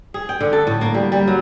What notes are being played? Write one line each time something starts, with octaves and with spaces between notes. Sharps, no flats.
G#4
G5
D3
A4
A2
A#3
G3
G3
F#3